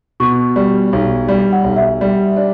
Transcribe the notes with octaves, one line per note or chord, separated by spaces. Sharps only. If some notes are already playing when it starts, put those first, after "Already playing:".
B2 C#6
G3
B1
G3
F#5
B1
E5
G3
D4